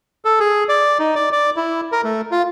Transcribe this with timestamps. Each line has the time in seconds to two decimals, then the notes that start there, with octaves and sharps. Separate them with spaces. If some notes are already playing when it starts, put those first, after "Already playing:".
0.25 A4
0.40 G#4
0.69 D5
0.99 D#4
1.15 D5
1.32 D5
1.56 E4
1.92 A#4
2.04 A3
2.31 F4